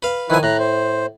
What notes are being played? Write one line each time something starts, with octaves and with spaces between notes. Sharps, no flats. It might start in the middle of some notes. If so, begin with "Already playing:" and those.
B4 F5
D#3 F3 E4 B4 G#5
A2 A#5 F#6
C5